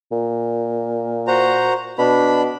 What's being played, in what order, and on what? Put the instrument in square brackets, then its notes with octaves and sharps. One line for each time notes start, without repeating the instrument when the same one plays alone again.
[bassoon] A#2
[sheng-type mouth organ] F#4 C5 A#5
[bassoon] B2 [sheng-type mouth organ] D4 B5